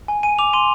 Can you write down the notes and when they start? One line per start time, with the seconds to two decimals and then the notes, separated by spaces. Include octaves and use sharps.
0.08 G#5
0.23 G#5 D#7
0.38 D6 F7
0.53 C6 D#7